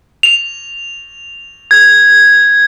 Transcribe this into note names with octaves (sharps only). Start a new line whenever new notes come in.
F7
G#6